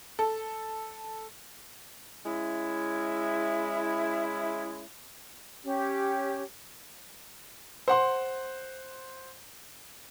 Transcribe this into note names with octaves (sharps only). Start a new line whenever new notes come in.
A4
G#3 C#4 E4
C#4 G4
C5 F#5 C6